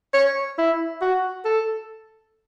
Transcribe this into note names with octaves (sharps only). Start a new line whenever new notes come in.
C#5
E4
F#4
A4